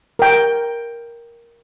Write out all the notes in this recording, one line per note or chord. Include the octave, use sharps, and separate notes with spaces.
A#4 G5